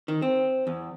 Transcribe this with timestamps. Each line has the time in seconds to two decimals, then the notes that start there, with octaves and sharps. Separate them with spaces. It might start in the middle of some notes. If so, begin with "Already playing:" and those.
0.08 D#3
0.22 C4
0.67 E2